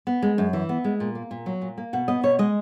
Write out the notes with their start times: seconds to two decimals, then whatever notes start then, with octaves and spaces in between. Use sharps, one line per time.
0.07 B3
0.22 G#3
0.38 F#2
0.53 E3
0.69 B3
0.84 G#3
1.00 A#2
1.15 A#3
1.31 A#2
1.46 F#3
1.62 A#2
1.78 A#3
1.93 B2 F#5
2.08 B3 D#5
2.23 B2 C#5
2.39 G#3 D#5